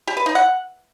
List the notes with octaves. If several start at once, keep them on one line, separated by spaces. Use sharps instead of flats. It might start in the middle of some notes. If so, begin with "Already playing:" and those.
G4
B4
D#4
F#5